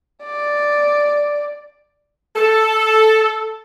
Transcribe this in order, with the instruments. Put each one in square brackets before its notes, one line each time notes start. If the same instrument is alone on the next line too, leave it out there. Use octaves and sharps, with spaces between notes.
[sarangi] D5
[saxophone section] A4